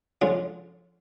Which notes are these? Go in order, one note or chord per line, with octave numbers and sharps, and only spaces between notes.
D3 F3 G#3 C#4 F4